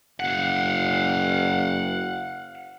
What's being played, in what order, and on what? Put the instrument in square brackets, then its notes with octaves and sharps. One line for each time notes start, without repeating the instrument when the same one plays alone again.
[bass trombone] F#1 [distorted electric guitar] F5 F#5